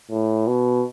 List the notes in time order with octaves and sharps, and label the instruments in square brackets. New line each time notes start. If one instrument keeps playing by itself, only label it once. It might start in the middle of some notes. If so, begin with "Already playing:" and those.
[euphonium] A2
B2